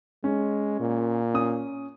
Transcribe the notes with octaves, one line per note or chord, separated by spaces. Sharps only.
G#3 C#4
A#2
C#4 D#6